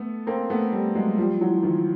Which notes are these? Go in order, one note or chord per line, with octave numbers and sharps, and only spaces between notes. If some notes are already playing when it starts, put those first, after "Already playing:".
Already playing: A3 B3
A#3 C4
A3 B3
G3 A3
F#3 G#3
F3 G3
E3 F#3
D#3 F3